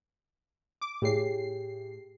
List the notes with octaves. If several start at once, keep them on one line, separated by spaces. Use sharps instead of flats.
D6
A2 G4 G#4 C#5 C7